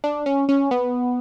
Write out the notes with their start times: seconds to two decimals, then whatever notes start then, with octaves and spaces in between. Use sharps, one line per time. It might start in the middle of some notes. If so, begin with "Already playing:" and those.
0.04 D4
0.26 C#4
0.49 C#4
0.71 B3